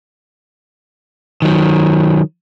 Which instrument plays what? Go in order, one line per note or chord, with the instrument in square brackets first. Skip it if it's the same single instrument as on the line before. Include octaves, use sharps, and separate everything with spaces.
[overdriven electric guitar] D#3 F#3